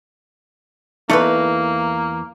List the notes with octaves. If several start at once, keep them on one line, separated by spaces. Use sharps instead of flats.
E2 E3 A3 A#3 D#4 B4